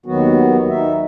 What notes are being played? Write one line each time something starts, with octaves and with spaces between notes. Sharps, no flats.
D#2 D#3 F#3 B3 F#4
D#4 E5